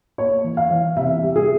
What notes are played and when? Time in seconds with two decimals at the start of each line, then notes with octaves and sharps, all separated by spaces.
0.18 A#3 C#5
0.44 E3
0.57 F5
0.71 E3
0.97 C3 E5
1.23 G3
1.36 G#4